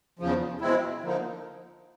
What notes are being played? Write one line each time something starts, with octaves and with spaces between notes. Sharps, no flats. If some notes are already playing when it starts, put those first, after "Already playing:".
E2 C#3 F3
B2 G#3 C4 E4
D3 F3 A#3 D#4